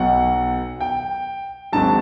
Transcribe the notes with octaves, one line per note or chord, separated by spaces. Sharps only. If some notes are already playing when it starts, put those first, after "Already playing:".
Already playing: B1 B2 F#3 F#5
G5
G#1 G#2 D#3 F#3 A5